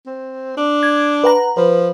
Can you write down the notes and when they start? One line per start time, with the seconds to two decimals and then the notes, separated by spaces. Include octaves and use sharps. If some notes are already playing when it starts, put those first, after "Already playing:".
0.07 C4
0.57 D4
0.83 G#6
1.24 B4 F#5 A#5
1.57 F3 B4